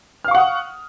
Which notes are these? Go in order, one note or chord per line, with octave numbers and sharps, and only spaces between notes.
F5 F#5 C#6 D#6 F6